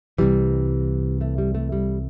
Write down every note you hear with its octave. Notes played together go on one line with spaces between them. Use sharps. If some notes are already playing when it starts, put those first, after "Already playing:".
C2 C3 E3 G3
A3
G3
A3
G3